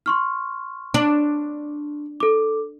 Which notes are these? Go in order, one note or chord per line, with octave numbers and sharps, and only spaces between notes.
C6 C#6 F6
D4
A4 D6